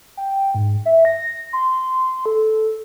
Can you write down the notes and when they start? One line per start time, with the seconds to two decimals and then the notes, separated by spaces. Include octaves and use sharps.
0.17 G5
0.54 G#2
0.86 E5
1.05 A#6
1.53 C6
2.26 A4